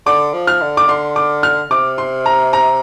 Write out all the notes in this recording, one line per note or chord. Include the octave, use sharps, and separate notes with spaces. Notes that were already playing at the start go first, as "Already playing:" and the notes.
D3 D6
F3
F6
D3
D6
D3 C6
D6
F6
C3 D6
C6
A#5
A#5